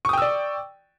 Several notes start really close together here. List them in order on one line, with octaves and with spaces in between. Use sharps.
C#6 D#6 G5 E6 D5